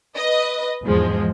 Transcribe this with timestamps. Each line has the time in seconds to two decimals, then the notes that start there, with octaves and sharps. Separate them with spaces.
0.16 B4 D#5
0.85 E2 G#2 F3 G#3